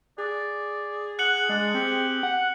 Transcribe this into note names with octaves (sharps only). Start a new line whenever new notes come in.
G#4 D5
F#5 F#6 C#7 F#7
G#3 D4
C4 G4
F#5